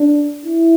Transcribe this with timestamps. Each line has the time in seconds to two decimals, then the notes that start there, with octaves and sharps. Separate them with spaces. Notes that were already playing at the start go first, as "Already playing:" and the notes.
Already playing: D4
0.45 E4